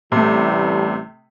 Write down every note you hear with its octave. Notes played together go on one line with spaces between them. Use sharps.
A1 C3 E3 G3 A3